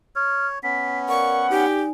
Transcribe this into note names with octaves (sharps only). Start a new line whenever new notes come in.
C#5 F6
B3 C#4 B6
A#4 D5 F5 F#5 C#6
D#4 G4 D5 G#5